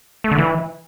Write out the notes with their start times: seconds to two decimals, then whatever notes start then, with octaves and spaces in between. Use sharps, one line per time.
0.24 A3
0.31 D3
0.38 E3